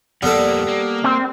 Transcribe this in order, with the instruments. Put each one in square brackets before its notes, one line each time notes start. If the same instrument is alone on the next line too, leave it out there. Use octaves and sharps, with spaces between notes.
[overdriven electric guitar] F2 A#3 [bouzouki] G3 [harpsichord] B3 A4
[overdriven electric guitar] A#3
[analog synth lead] C4